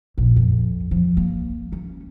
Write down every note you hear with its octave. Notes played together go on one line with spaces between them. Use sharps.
A#1
F2
F3
A#3
C#4